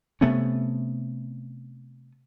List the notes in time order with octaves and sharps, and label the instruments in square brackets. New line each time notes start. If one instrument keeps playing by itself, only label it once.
[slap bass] C3 A3 B3 C#4